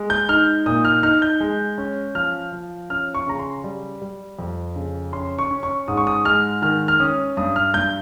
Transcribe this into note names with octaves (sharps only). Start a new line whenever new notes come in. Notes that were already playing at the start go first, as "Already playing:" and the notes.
Already playing: G#3
G6
D#4 F6
A#2 D#6
F6
D#4 F6
G6
G#3
C#4
F3 F6
F3
C#4 F6
C#6
C#3 A#5
C6
G3
G3
F2
C#3
C#4 C6
C#6
C#4
C#6
G#2 D#6
C#6
D#6
G#3 F6
D#3 F6
F6
C#4 D#6
G2 D#6
F6
G2 G6